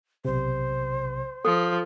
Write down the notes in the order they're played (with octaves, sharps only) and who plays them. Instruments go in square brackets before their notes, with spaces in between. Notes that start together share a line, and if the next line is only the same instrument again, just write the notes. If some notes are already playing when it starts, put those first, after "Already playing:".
[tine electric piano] B1 C3 [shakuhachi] C5
[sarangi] F3 [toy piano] A4